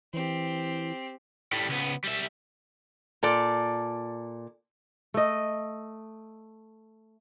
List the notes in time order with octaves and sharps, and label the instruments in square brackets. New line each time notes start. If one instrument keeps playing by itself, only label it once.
[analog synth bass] E3 [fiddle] C4 G4
[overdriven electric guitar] A2 G3
C#2 B3
G3 E5
[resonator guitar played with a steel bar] A#2 A4 D5
[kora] A3 D#5